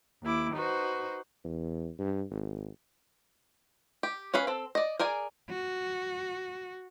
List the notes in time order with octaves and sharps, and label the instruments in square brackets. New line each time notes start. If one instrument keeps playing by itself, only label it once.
[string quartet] D#2 E4 D6
D#4 F#4 B4 C5
[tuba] E2
G2
G#1
[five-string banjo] G4
C#4 G#4 B4 F5
C4 A4
D5 D#5
G#4 A#4 D5 G#5
[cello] F#4